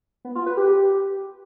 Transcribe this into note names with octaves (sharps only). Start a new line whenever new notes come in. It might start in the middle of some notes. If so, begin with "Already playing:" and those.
B3
F4
B4
G4